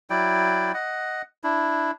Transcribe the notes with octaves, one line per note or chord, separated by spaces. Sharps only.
F#3 E4 D5 G5
D#5 F#5
D4 E4